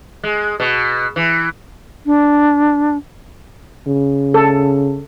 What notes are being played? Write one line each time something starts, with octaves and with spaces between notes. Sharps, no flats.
G#3
B2
E3
D4
C#3
A4